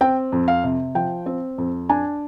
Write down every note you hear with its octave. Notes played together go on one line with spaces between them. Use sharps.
C4 G5
F2
F5
C3
F3 G5
C4
F2
D4 G#5